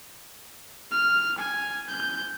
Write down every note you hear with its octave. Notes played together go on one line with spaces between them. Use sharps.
F6
G#5
G6